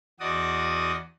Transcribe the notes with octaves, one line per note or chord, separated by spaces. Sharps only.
E2 F#4 D5 D#5 D#6